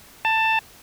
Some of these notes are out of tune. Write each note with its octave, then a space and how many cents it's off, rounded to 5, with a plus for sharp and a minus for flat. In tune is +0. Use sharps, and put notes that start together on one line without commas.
A5 +15